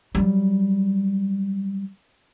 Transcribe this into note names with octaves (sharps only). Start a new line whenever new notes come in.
F#3 G3